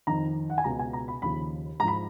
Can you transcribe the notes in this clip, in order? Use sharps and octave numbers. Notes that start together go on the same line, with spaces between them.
F2 D#3 A#5
F#5
G#5
C#2 B2 A#5
G#5
A#5
B5
D#2 C#3 F3 B5
G#2 F3 A#5 B5